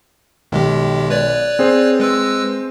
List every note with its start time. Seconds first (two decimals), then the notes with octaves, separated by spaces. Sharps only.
0.52 B1 D#3 G#3 G4
1.10 B4 C#5 D5
1.59 C4 G#4 C5
2.00 G#3 B4 E6